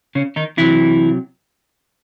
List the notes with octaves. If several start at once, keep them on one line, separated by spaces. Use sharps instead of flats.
C#3 C#4
D#3 D#4
C3 E3 F#3 E4